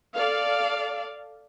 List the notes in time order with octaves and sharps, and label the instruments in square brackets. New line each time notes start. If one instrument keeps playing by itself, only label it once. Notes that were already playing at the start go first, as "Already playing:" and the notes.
[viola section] A4 D5 F5